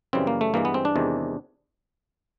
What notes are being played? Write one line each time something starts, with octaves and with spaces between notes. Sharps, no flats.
F#2 C#3 E3 G3 C4
A#3
A3
G2 E3 G#3 A#3
B3
C4
D4
E2 C3 D#3 G#3